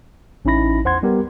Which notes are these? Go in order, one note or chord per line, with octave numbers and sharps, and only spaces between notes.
A1 C#4 D#4 E4 B5 A#6
E2 C5 F#5 C6 G#6
G3 B3 G4 A#4